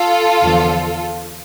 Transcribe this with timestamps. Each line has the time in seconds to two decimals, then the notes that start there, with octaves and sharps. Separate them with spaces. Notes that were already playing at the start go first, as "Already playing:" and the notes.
Already playing: F4 A4
0.41 E2 D3 F3